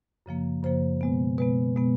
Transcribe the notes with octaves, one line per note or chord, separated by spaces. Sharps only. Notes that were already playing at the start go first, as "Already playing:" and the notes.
F#2 C#3 F3 A#3
F#2 C#3 F3 A#3 C5
B2 G#3 B3
B2 G#3 B3 B4
B2 G#3 B3